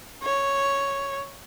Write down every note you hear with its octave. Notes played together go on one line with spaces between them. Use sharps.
C#5